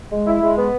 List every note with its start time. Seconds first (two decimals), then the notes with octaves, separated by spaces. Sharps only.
0.11 G#3
0.27 E4
0.42 G#3
0.58 B3